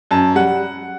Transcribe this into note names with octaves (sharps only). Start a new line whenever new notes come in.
F#2 A5
G3 F#5